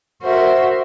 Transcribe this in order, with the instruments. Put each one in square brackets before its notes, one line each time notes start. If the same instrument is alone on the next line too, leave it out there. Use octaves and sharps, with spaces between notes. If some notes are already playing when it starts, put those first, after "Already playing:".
[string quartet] F#4 A#4 C5 E5